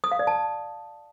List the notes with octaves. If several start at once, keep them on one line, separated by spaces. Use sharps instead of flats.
D#6
F5
D5
A5